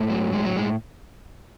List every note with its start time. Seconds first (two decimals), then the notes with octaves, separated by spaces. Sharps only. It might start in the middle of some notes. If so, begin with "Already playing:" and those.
Already playing: G#2 A3
0.10 F#3
0.33 A2 G#3
0.45 F#3
0.56 A2 G#3